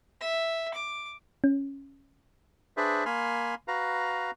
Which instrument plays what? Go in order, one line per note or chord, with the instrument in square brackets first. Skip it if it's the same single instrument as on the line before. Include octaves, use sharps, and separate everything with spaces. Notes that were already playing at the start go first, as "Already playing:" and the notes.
[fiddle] E5
D6
[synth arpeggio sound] C#4
[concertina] D4 G#4 B4 C5 D5 E5
A#3 G#5 B5 C6 F6
F#4 B4 F5 A#5